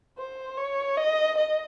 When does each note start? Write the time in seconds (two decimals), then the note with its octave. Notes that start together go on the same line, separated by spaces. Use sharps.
0.18 C5
0.57 C#5
0.97 D#5
1.37 D#5